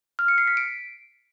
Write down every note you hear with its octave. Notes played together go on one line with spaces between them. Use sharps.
F6
C#7
C7
B6
D7